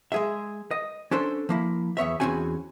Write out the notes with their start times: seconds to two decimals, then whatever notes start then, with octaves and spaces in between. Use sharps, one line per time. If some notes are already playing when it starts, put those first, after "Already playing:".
0.12 G#3 G#4 E5
0.71 D#5
1.11 C#4 D4 A4 C5
1.49 F3 A#3 E4
1.97 E2 B3 C#5 E5
2.20 E2 F3 C4 C#4 F#4 G#5